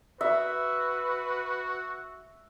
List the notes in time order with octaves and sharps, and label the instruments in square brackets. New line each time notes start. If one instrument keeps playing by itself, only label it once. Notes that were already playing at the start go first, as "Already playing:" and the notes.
[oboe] F#4 [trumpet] B4 [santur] E5